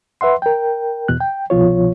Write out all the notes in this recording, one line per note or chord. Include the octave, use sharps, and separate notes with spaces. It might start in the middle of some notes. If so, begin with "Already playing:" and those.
B4 E5 F#5 C6
A#4 G5
E2 B2 F#6
G5
C2 B2 F3 F4 C#5